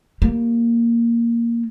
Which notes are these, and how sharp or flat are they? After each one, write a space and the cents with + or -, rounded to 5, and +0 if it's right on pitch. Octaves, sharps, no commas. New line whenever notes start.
G3 +0 A#3 +0